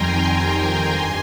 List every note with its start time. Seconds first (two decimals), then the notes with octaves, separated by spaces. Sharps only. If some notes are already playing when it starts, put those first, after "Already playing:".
Already playing: F2 D#3 G3 G5 G#5 A#5 C6
0.22 G#5 C6
0.90 G2 G#5 C6